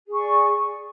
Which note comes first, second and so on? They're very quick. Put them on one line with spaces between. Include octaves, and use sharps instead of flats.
G#4 C#6 D5